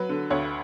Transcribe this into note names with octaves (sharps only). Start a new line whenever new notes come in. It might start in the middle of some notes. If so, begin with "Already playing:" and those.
Already playing: F#3 B4
D3
D2 C#5